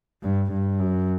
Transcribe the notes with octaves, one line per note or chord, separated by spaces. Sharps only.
G2
G2
F#2